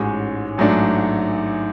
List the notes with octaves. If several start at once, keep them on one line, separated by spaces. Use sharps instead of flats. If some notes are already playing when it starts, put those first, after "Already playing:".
Already playing: A1 G#2 G#3 C#4 F#4
A1 G#2 F#3 A3 D4